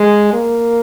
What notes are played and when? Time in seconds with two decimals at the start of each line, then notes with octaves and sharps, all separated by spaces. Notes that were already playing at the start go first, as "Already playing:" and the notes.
Already playing: G#3
0.33 A#3